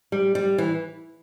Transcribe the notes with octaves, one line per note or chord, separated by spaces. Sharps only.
G3
G3
E3